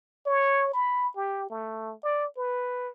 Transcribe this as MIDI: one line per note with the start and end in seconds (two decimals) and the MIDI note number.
0.26 0.72 73
0.73 1.09 83
1.16 1.47 67
1.50 1.94 57
2.03 2.26 74
2.37 2.89 71